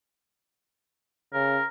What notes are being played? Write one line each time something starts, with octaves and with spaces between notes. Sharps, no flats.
C#3 A#4